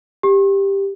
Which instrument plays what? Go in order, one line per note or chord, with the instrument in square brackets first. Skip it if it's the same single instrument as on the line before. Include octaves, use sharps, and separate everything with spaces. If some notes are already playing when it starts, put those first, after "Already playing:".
[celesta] G4